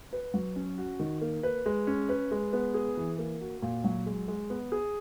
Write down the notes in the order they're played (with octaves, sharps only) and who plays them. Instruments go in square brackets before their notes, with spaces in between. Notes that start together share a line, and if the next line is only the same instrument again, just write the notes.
[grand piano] B4
F#3
C#4
F#4
D#3
A#3
B4
G#3
C#4
B4
G#3
B3
G#4
E3
A#3
F#4
A#2
F#3
G#3
G#3
B3
G#4